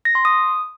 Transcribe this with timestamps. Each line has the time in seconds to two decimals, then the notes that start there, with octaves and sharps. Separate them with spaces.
0.05 A#6
0.15 C6
0.25 D#6